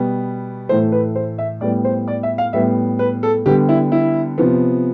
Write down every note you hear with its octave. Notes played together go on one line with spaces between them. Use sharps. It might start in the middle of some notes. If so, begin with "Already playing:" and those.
Already playing: B2 G3 B3
A2 E3 A3 C5
B4
C5
E5
A2 G3 B3 D5
C5
D5
E5
F5
A2 G3 B3 E5
B4
A4
D3 G3 B3 G4
E4
E4
C3 F3 B3